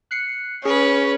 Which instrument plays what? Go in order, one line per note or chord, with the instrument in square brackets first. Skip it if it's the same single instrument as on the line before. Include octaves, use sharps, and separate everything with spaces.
[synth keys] F#6 C7 C#7
[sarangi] C#4 [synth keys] G#4 [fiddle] B4